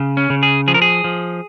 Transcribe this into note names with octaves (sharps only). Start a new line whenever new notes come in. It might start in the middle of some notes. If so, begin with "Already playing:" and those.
Already playing: C#3
C#4
C#3
G#4
F3 G#4
A#4
G#4
F3